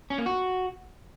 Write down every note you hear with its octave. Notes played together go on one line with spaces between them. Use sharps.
C#4
A#3
F#4